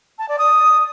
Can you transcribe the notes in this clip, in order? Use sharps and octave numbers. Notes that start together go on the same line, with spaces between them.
A5
D5
D#6